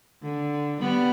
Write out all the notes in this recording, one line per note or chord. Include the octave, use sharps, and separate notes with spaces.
D3
G3 B3